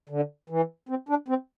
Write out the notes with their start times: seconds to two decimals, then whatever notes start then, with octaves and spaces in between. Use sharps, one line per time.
0.09 D3
0.50 E3
0.89 C4
1.09 D4
1.28 C4